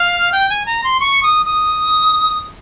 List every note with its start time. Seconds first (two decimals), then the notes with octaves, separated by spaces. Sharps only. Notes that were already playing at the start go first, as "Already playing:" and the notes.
Already playing: F5
0.32 G5
0.50 G#5
0.66 A#5
0.84 C6
1.00 C#6
1.23 D#6
1.46 D#6